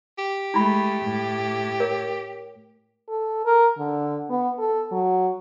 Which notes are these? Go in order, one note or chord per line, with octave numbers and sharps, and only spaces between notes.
G4
G#3 A3 E4 B5
A2
A#4 C#5
A4
A#4
D3
B3
A4
F#3